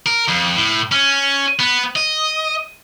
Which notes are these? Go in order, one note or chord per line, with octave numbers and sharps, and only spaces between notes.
A#4
F2
A2
C#4
B3
D#5